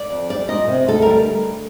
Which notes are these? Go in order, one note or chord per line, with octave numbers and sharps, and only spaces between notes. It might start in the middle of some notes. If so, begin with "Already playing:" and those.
Already playing: D5
F2
G3 D5
A#2 D#5
C3
D2 A4
G3 A#4